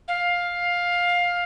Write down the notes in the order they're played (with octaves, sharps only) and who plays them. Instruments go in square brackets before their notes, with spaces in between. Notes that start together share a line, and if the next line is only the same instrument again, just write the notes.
[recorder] F5